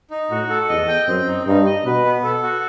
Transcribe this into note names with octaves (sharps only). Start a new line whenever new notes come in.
D#4
A2 F#4
A4
E2 D#5
G5
F#2 C4
D#4
G2 D#4
D#5
B2 B4
B3
A4
F#4